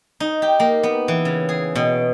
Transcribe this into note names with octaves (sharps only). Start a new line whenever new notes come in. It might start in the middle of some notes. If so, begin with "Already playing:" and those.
D#4
G4
A#3
B3
E3
C#3
G#4
B2